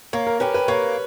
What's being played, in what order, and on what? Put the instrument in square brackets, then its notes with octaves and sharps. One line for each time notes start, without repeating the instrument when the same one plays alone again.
[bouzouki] A#3 [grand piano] C#5
[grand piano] A#4
[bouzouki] C#4 G4 [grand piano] B4
[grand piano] B4
[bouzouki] A#3 [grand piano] C#5